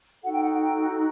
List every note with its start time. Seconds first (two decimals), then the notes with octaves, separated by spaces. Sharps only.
0.22 D#4 F#4 A4 F#5
0.32 G5
0.42 F#5
0.61 G5